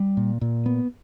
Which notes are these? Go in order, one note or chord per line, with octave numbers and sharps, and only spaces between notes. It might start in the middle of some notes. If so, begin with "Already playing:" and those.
Already playing: G3
A#2
A#2
B3